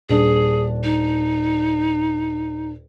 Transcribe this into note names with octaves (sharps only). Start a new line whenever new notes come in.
D#1 D4 G#4
D#4